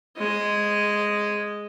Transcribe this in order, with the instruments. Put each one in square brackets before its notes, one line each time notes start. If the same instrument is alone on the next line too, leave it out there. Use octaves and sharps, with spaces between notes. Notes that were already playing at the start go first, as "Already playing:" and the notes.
[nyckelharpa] G#3 D#5